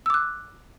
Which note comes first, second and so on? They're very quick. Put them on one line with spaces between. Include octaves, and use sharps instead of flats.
E6 D6 F#6